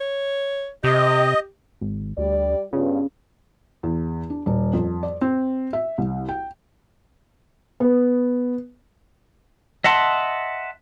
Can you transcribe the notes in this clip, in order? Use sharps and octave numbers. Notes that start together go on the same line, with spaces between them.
C#5
C3 G4 D#5
G#1
D2 G3 D5
G2 C#3 B3 F4
E2
D4
D#1
F2
D5
C4
E5
C2
G5
B3
D#5 E5 F#5 A5 C6